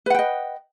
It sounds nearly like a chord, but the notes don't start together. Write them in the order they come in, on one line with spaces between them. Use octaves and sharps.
B4 F#5 G5 D#5